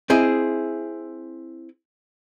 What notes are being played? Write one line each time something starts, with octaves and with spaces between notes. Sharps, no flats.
C4 E4 G#4 D#5